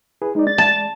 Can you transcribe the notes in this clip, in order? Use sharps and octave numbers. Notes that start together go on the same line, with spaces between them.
E4 G#4 B4
G#3 D#4 D5
A6
A5